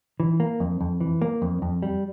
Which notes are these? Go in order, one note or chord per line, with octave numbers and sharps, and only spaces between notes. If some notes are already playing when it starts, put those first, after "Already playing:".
E3
A#3
F2
F2
E3
A#3
F2
F2
G3